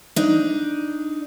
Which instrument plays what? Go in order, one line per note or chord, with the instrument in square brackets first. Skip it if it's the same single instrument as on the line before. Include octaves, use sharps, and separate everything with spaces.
[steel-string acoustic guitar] D4 D#4